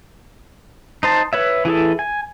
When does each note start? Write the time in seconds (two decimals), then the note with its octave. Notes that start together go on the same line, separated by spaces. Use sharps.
1.03 D#4 C5 A5
1.33 B4 C#5 E5
1.65 E3 E4 G#4 A4
1.99 G#5